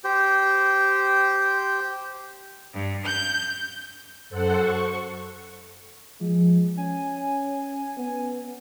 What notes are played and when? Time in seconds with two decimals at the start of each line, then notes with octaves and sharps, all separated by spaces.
0.04 G4 C5
2.73 G2
3.06 G6
4.30 F#2 A4 C5 F#5
4.58 C#6
6.20 F3 G#3
6.77 C#4 G#5
7.97 B3